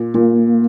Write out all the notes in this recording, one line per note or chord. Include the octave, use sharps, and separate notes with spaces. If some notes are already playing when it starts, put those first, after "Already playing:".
Already playing: A#2
A#2 A#3